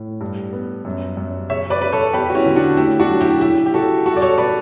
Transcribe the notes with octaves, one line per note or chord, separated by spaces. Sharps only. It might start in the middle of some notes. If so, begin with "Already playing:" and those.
Already playing: A2
G2
B3
F#2
F#2
C#3 C#5 E5
B4 D5
C#3 B4
A4 C#5
E2 G4 B4
F#4
C#4 E4
D3
D4 F#4
A3 E4 G4
D4 F#4
F#3
E4 G4
C#3 E4 G4
G4
C#3 F#4 A4
G3 F#4 A4
D5
A4 C#5
B4 D5